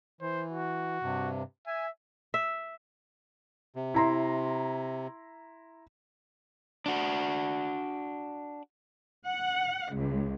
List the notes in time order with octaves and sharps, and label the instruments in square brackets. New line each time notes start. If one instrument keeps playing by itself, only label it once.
[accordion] E3 [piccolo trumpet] C5
[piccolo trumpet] F#4
[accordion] G2 C3
[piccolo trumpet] E5 [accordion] G#5
[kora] E5
[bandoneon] C3
[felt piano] E4 A#5 C6
[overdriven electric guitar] D4 F#4
[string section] F#5
C#2